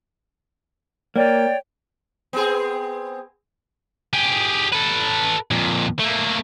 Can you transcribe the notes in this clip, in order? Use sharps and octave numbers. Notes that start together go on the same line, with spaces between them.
A#3 C#5 D5 G5
B3 C4 G#4
G4 G#4
A4 B4
F2 A#2
A3 A#3